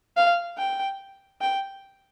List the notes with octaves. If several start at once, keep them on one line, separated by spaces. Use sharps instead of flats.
F5
G5
G5